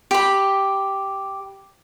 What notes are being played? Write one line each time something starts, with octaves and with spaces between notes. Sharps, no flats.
G4 B5